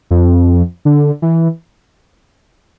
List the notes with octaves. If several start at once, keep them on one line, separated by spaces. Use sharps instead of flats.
F2
D3
E3